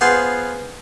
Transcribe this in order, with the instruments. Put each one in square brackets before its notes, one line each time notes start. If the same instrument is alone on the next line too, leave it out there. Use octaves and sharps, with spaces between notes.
[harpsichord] B3 F4 G#4 C5 F#5